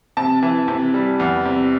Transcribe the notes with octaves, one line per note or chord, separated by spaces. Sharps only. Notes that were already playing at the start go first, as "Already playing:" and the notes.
C3 A5
E3
C3
G3
E2
C3